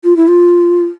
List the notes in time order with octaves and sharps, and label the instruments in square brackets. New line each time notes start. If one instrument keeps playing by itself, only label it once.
[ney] F4
E4
F4